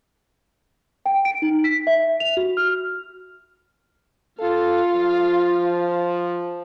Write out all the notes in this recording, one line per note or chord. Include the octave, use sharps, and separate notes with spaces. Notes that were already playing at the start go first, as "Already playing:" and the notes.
G5
D7
D#4
B6
E5
F7
F#4
F6
F4 A4 F5
F3